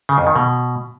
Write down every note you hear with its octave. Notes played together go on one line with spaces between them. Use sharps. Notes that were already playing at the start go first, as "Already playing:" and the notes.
C#3
F2
D#3
B2